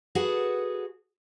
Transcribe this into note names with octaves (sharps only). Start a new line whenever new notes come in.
F#4 G#4 A4 B4 F#5